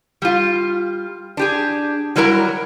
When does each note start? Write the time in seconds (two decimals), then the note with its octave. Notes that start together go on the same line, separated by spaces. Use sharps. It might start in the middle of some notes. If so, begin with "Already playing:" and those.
0.22 G3 F4
1.37 D4 G4 G#4
2.16 F#3 G3 E4 A#4 A#5